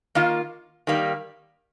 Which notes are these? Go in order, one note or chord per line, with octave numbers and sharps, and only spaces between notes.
D#3 A#3 F4
D#3 G3 A#3